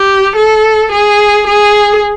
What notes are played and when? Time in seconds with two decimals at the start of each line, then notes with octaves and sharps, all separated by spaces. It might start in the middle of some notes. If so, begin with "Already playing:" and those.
Already playing: G4
0.36 A4
0.92 G#4
1.47 G#4